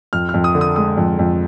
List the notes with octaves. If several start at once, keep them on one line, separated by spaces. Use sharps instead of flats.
F2 F6
F6
F2
D#6
D3
D#6
G#3 D#6
F2
F2